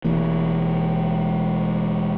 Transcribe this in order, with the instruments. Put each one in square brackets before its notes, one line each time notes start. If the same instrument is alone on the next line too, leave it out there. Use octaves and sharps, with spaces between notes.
[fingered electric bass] E1 E3 A#3